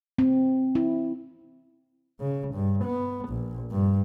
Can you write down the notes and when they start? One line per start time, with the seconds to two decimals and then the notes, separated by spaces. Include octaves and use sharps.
0.18 C4
0.75 E4
2.20 C#3
2.54 G2
2.84 B3
3.28 A#1
3.71 G2